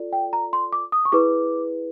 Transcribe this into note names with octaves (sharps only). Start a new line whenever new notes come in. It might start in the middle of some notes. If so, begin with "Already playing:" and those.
Already playing: F4 A4 D5
G5
A#5
C6
D6
D#6
C#6
E4 G#4 B4 D6